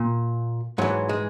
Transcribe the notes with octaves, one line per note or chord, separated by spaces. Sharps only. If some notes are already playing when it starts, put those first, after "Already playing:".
Already playing: A#2
G#2 E3 F#3
G#3